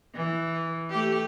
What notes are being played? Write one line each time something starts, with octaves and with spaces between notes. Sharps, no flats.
E3
A3 G4